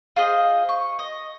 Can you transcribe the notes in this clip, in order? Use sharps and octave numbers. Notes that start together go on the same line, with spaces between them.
F4 G#4 C5 D#5
C#6
D#5